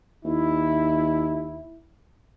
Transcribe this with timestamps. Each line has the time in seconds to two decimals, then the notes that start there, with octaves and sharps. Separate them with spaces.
0.25 D#2 E4